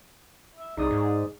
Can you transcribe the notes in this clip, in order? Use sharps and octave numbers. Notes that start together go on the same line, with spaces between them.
E5
C2 D#4 G#4 D5 D#6
G#2